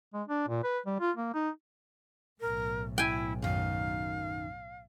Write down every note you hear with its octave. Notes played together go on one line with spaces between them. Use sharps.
G#3
D4
A#2
B4
G3
F4
A#3
D#4
B1 A2 A#4
E4 G5 G#5
F#2 D#3 F5